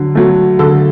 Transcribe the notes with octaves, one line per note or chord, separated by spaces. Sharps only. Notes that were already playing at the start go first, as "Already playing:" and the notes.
Already playing: D3 F#3
F#3 A3
D3 A4